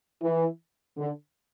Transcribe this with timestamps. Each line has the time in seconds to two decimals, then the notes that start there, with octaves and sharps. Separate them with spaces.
0.22 E3
0.98 D3